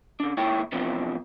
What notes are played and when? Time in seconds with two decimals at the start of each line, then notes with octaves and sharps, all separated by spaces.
0.20 C#3 D4
0.37 D#2 G#2 E4 C#5 G5
0.72 C3 E3 F3 B3 C4 D4